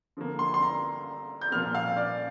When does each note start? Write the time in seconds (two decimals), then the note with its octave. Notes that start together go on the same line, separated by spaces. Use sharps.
0.17 D3 F3 A#3
0.39 C6
0.54 C6
0.62 A#5
1.42 G6
1.52 A#2 F3 A#3 F6
1.75 F5
1.97 D5